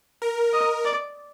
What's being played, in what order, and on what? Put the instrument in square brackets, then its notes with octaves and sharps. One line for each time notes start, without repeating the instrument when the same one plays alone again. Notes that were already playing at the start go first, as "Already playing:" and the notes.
[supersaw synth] A#4
[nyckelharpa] D#5
D5